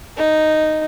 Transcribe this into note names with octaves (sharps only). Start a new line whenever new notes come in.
D#4